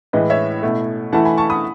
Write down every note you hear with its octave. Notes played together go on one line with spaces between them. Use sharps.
A2 E3 G#3 B4 D#5
C#5 E5
B2 A3 E4
E3 A3 E4 F#5 A5
G#5 B5
A5 C#6
B5 D#6